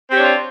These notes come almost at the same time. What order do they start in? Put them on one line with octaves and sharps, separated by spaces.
C4 G4 C#5 D4 F4